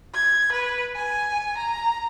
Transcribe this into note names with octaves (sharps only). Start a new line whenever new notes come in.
G#6
B4
G#5
A#5